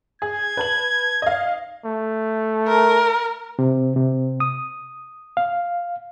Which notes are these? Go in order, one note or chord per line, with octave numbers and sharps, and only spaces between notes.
G#4 G#6
B4 A5 F#7
D#5 F5
A3
A#4
C3
C3
D#6
F5